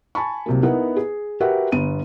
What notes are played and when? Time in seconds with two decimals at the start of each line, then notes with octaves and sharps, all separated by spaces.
0.15 G#5 A5 B5 C#6
0.46 C2 C3 F#3 A#3
0.63 B3 D#4 E4 A#4 B4 F#5
0.97 G#4
1.40 F#4 G4 A#4 B4 E5 F#5
1.72 G1 B3 D#7